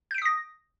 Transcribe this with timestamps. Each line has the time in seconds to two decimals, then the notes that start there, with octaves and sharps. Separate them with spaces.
0.11 G6
0.14 D7
0.18 B6
0.22 D#6
0.25 A#6